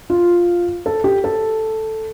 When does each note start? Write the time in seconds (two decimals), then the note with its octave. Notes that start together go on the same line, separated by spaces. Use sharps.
0.10 F4
0.86 A4
1.04 G4
1.24 A4